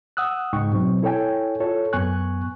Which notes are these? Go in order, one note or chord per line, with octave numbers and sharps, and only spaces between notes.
F#5 D#6 E6 F#6
C#2 G#2 G#3 D#4 G5 C#6
B2 F#3 C4
E4 A4 C#5 G5 G#5
F4 A4 C#5
F#2 B3 G#5 C#6 F#6